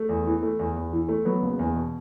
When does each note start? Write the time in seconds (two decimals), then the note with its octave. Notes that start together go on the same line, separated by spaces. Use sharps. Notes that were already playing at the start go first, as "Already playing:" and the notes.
Already playing: A3
0.09 E2
0.27 E3
0.43 A3
0.59 E2
0.76 E2
0.93 E3
1.09 A3
1.25 F#3 B3
1.42 F#1
1.59 E2
1.76 B2